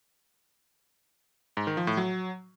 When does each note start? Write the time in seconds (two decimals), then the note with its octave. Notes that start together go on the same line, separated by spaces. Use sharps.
1.57 G#2
1.67 D#3
1.77 F3
1.87 A2
1.97 F#3